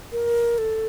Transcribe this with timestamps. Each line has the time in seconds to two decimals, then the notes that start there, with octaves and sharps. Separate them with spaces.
0.12 A#4
0.58 A4